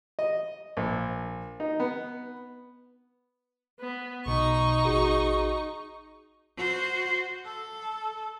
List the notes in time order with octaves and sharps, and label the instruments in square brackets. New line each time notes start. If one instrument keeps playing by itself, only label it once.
[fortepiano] D#5
A#1
D#4
B3
[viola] B3
[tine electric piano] B1 B2 [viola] D#4 C#6
[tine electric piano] A1 F#4 G#4
[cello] F#4 C5
A4